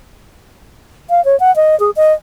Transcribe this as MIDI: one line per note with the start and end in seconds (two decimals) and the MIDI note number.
1.10 1.24 77
1.25 1.38 73
1.40 1.54 78
1.56 1.78 75
1.80 1.90 68
1.96 2.13 75